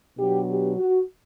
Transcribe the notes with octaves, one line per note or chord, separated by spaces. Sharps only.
B2 F#3 B3 D4 G4
G4
F#4